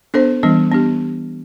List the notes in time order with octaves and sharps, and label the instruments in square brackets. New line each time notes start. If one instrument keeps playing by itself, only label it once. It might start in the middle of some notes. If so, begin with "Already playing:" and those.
[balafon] B3 D4 A4 C5
E3 G3 B3 D4
B3 D4 G4